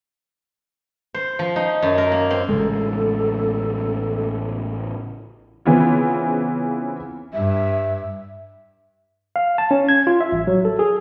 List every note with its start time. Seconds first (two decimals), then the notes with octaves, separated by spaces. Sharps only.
1.14 C5
1.39 F3
1.56 D#4
1.82 F#2
1.98 A#4
2.12 A#3
2.31 C4
2.49 A1 C#3 G#3 A4
5.65 C#3 E3 B3 C4 F4
7.33 G2 E5
9.36 F5
9.58 A5
9.71 C#4
9.89 G#6
10.07 F4
10.21 E5
10.32 A1
10.47 F#3
10.65 A4
10.79 G#4